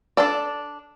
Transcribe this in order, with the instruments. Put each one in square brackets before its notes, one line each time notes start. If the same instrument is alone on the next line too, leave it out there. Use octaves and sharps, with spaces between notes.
[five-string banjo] D4 A4 D5